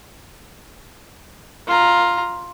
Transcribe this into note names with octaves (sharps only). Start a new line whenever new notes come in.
F4 A#5